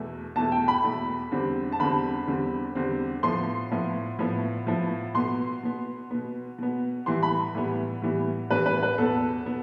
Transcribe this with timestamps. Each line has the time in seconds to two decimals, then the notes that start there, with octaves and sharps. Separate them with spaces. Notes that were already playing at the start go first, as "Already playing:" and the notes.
Already playing: E2 B2 A3
0.36 E2 B2 A3 A5
0.52 G5
0.68 B5
0.84 E2 B2 A3
1.31 E2 D3 G3 C4
1.72 A5
1.79 E2 D3 G3 C4 B5
2.27 E2 D3 G3 C4
2.75 E2 D3 G3 C4
3.23 A2 F3 B3 C6
3.71 A2 F3 B3
4.19 A2 F3 B3
4.67 A2 F3 B3
5.15 B2 B3 C6
5.63 B2 B3
6.11 B2 B3
6.58 B2 B3
7.06 A2 E3 G3 B3 C6
7.23 B5
7.55 A2 E3 G3 B3
8.02 A2 E3 G3 B3
8.50 A2 E3 G3 B3 B4
8.66 B4
8.83 B4
8.98 E2 B2 B3 A4
9.46 B2 B3